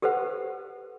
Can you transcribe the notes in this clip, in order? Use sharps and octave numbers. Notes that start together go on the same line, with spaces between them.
G4 A4 B4 C5 F#5